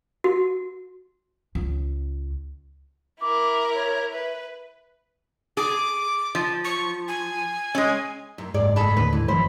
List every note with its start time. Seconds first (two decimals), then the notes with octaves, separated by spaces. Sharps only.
0.24 F#4
1.55 C#2
3.21 E4 A#4 D6
3.74 C#5
4.13 B4 E5
5.57 G#4 D6
6.35 F3
6.65 C#6
7.08 G#5
7.75 G#3 C#4
8.38 F#2
8.54 F#1 G#2 G#4 D5
8.76 G#4 A4 B5
8.97 D#2 A2 D3 B4
9.13 G#2 E4
9.28 F1 F#2 E3 C5 B5